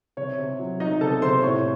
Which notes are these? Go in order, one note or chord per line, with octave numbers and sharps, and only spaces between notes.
C3 C#5
C3
F#3
F#3 D#4 D#5
C3 A4 A5
C3 C5 C6
A2 C#5 C#6